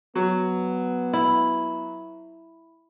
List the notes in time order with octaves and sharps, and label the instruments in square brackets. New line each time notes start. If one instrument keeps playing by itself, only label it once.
[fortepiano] F#3 [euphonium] B3
[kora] E4